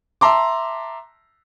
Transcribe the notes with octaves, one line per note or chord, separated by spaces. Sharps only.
E5 A5 A#5 C6 D6